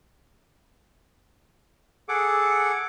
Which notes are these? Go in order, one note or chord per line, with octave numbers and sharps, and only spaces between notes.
G#4 A4 F#5 D6